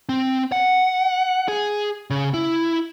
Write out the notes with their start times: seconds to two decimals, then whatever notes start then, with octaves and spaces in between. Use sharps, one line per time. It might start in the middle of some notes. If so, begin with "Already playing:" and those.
0.09 C4
0.52 F#5
1.48 G#4
2.10 C#3
2.34 E4